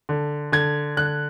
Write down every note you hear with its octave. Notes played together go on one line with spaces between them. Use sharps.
D3
D3 G#6
D3 F#6